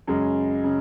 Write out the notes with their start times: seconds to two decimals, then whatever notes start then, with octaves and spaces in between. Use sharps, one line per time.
0.07 F#2 C#3 G#3
0.64 C#3